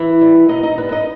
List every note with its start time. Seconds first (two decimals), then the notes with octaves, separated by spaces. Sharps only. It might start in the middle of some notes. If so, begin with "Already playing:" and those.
Already playing: E3 E4
0.21 G3
0.49 B2 D#4 D#5
0.63 D#4 D#5
0.78 G3 B3 B4
0.91 D#4 D#5